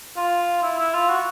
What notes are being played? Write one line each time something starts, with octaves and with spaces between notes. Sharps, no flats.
F4
E4
E4
F4
F#4